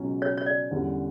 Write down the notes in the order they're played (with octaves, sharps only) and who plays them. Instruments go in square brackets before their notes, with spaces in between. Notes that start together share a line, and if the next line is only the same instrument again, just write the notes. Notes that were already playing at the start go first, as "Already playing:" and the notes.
Already playing: [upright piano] C#2 B2 F#3 C#4
[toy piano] C#5
C#5
D5
[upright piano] E2 D3 G3 C#4